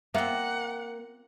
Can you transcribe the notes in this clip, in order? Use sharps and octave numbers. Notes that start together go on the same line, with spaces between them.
A#3 C4 F4 E5 F#5